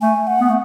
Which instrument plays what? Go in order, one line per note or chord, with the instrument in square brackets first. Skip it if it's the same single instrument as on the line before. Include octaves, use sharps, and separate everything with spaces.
[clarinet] A3 [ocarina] G#5
[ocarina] F#5
[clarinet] B3
A3